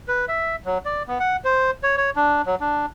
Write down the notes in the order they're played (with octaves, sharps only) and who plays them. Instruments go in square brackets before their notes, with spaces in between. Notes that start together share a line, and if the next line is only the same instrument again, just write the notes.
[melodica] B4
E5
F#3
D5
B3
F#5
C5
C#5
C#5
D4
F#3
D4